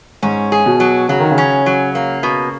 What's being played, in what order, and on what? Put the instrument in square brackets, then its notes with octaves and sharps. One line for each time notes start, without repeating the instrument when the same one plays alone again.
[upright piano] G#2 [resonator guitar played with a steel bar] C#4
[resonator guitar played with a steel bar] G#4
[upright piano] B2
[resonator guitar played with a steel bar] F#3
[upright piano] C#3 [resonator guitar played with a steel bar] F#3
[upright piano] D#3
C#3
[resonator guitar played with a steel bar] C#4
F#3
A#3
B2